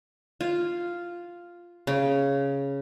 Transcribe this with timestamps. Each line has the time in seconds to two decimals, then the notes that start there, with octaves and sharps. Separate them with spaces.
0.41 F4
1.87 C#3